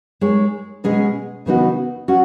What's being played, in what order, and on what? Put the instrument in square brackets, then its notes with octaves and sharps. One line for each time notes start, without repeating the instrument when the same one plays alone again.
[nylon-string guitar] G#3 D#4 G#4 C#5
B2 G#3 C#4 G#4 D#5
C#3 E3 B3 D#4 F#4
C#4 F#4